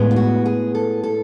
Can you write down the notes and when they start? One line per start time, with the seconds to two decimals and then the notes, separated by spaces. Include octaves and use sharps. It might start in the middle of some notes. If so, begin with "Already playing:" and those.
Already playing: A2 G#3 B3
0.11 F4
0.16 F#4
0.46 G#4
0.75 A4
1.04 A4